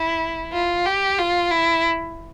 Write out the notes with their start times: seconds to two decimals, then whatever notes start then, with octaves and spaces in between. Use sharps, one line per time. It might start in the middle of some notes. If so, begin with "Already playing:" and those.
Already playing: E4
0.52 F4
0.85 G4
1.18 F4
1.51 E4